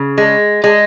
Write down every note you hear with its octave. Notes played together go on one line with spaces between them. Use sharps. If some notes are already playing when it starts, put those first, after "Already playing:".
Already playing: C#3
G#3
G#3